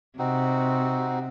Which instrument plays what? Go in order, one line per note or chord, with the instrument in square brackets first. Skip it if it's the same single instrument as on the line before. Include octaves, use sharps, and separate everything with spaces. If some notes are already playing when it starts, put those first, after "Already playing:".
[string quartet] C3 [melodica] C4 D#4 F#4